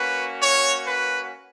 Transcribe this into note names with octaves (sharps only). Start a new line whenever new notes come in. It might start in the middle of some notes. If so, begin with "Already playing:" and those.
Already playing: A#3 C#4 F#4 B4
C#5
B4